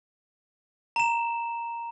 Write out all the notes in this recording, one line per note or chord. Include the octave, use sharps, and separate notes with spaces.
A#5 E7